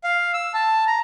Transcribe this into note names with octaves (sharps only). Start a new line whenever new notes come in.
F5
E6
A5
A#5